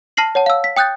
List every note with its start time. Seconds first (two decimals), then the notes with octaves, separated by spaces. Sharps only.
0.17 A5 F6 A#6 C7 F#7
0.35 C#5 F#5 A5
0.46 F5 E6
0.64 B6
0.77 G5 D#6 F#6 G6 A6